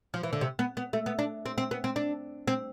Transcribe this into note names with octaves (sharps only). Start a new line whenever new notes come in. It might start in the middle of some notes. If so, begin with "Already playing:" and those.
F3
E3
D3
C3
B3
B3
A3
B3
D4
C4
C4
B3
C4
D4
C4